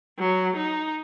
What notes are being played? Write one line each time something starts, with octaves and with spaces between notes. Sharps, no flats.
F#3
D#4